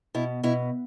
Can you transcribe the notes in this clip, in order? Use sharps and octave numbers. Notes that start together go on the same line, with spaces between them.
B2 E4
B2 E4